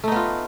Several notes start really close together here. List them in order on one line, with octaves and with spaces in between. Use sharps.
A3 D#4 B3 F4